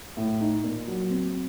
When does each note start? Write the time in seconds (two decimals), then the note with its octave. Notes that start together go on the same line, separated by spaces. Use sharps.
0.17 A2
0.41 D#4
0.64 A#2
0.87 F#3
1.10 C4